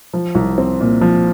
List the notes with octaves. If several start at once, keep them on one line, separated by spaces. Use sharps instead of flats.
F3
C2
C4
A#2
F3